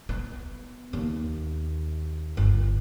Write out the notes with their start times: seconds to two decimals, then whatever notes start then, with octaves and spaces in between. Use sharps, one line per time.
0.09 B3
0.93 D#2
2.37 G1